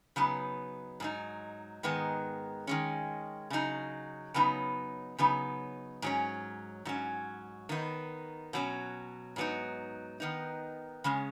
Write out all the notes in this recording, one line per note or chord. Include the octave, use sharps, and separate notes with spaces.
C#3 F#3 B3 D#4
G#2 F#3 D#4
G#2 D#3 G#3 B3
D#3 G#3 C#4
C#3 F#3 D#4
C#3 F#3 B3 D#4
C#3 F#3 B3 D#4
G#2 F#3 C#4
G#2 F#3 C#4
D#3 B3 D#4
B2 F#3 C#4
G#2 F#3 B3 D#4
D#3 B3 D#4
C#3 G#3 C#4